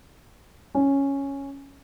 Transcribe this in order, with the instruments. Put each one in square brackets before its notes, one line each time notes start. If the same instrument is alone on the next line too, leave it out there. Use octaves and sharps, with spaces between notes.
[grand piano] C#4